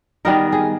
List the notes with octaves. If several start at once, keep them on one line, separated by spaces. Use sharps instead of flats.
D#3 G3 B3 D#4 A#4
G#4